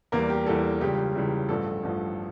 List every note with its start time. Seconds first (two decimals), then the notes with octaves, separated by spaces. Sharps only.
0.12 E2 E3 G3 A#3 A#4
0.30 G4
0.46 E2 E3 G3 A4
0.81 C#2 C#3 E3 G3 G4
1.15 C#2 C#3 E3 G3
1.49 A1 G2 F3 A4
1.83 A1 G2 F3